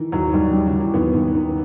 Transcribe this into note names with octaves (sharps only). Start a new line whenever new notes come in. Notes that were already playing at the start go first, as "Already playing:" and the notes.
Already playing: D#3 E3
D#2 F#3
D#2 G3
G3
F#3
D#3
E3
D#2 B3
D#2
D#3